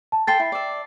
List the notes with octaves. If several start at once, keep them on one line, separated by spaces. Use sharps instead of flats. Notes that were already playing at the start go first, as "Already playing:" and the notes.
A5
A4 G5 C6 A6 C7
E4
D5 E5